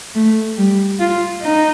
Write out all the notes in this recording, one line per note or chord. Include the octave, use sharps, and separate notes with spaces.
A3
G3
F4
D#4